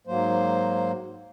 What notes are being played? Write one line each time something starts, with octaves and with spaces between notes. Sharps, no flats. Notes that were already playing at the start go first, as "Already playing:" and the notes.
G#2 F#3 A#3 C5